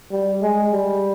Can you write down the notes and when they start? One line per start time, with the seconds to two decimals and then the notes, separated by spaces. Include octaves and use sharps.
0.11 G3
0.42 G#3
0.73 G3